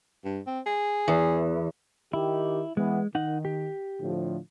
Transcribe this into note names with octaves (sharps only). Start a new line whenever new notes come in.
G2
C4
G#4
E2
D#3 D#4 E4 G4
E3 G#3 B3
D#3 D#4 F#5
G4
A2 D3 F3